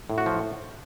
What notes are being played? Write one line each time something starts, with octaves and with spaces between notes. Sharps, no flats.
A2
F#4
F3